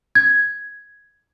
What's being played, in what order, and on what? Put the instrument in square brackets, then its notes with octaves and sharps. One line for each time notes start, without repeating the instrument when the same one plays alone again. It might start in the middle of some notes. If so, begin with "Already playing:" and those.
[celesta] G#6